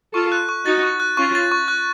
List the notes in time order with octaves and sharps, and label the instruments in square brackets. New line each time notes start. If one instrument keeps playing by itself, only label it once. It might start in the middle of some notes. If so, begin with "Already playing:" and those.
[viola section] F4 A4 [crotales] C#6
[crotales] F#6
C#6
[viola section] D#4 F#4 [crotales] A6
[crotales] C#6
F#6
[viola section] C#4 F4 [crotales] C#6
[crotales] A6
C#6
F#6